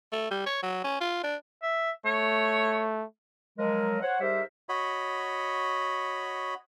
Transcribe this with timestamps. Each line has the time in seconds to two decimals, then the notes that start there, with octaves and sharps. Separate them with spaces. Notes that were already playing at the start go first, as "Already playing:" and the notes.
0.13 A3
0.31 G3
0.46 C#5
0.63 F#3
0.84 C#4
1.01 F4
1.24 D4
1.63 E5
2.06 A3 C#5
3.58 F3 F#3 G#3 A#4
4.02 C5 C#5 F#5
4.21 G#2 G3 G4 A#4 C5 E5
4.69 F#4 C#5 D#5 B5